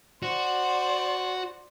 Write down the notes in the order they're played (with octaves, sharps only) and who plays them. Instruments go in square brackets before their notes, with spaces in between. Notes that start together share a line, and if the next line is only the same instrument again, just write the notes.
[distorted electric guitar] F#4 [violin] C5 D5